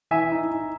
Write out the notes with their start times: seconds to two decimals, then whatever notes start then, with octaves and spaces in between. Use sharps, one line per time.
0.11 E3 E5 G#5
0.32 D#4
0.51 D#4